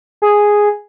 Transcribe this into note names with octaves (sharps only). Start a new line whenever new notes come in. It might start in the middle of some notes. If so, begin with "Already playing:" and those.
G#4